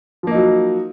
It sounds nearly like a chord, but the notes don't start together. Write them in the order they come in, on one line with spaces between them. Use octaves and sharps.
F3 A#3 D#4 F#3